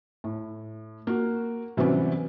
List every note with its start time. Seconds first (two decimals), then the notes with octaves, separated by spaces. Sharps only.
0.24 A2
1.07 A#3 F#4
1.77 C3 E3 F#3 G3 B3 C#4